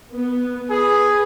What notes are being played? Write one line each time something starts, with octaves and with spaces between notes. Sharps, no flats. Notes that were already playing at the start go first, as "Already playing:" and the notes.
B3
G#4 B4